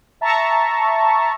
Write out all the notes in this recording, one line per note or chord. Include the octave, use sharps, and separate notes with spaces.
E5 A5 A#5 C#6